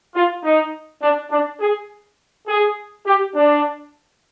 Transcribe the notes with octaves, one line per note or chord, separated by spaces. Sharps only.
F4
D#4
D4
D4
G#4
G#4
G4
D4